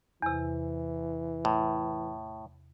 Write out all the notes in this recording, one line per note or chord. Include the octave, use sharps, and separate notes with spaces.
E2 C3 E3
A2